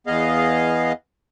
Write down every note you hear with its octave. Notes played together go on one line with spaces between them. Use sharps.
E2 B3 G#4 D#5 F5